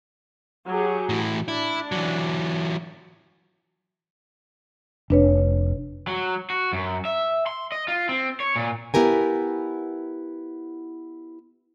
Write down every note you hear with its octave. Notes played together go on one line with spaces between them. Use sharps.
F#3 G4 G#4
A2 E3
D4 E4
E3 F#3
F1 D4 B4 C#5
F#3
F#4
F#2
E5
C6
D#5
F4
C4
C#5
A#2
B3 E4 G4 A#4 G#5